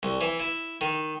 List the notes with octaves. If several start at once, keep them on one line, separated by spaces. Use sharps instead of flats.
C2
E3
E4
D#3